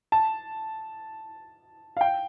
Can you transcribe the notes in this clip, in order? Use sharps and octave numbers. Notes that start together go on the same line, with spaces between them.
A5
F5
G5